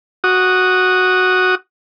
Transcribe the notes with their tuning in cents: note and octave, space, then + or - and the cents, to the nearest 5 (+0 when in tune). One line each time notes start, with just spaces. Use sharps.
F#4 +0 D#6 -10